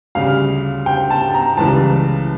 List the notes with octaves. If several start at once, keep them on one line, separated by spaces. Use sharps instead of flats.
D2 C#3 G3 F5
G5
A5
A#5
C#2 C#3 E3 G3 A5